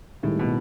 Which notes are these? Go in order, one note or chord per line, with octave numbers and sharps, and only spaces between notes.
C2 A2 C3 D#3 G#3
B2